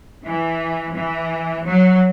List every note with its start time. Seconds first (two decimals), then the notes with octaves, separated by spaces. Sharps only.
0.24 E3
0.95 E3
1.65 F#3